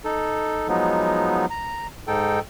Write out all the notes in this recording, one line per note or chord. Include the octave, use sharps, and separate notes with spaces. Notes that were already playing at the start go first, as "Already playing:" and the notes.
D#4 A4
F3 F#3 G#3 B3 D#4
A#5
G#2 D#4 A4 G5